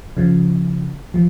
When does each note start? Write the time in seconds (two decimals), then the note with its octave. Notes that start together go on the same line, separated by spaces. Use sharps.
0.17 C#3 F3
1.14 F3